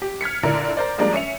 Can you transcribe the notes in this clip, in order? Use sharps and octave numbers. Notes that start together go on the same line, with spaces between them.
G4
F6 G#6 B6 C#7
A#2 D3 D4 E4 A#4
A#4 C5 D5
F3 G3 G#3 A#3 D4 A#4
C#4 E5 C#7 F7